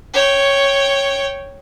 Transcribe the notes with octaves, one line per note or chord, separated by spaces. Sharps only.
C#5 G5